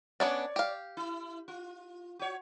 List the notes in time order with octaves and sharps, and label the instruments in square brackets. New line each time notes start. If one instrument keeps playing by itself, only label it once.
[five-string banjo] B3 C#4 D4 [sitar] C#5 D5
[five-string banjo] G4 F5
[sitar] E4
F4
F#4 C#5